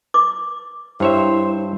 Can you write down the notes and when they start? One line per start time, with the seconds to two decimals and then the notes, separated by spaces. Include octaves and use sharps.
0.14 D6
1.00 G2 E4 C5 C#5 E5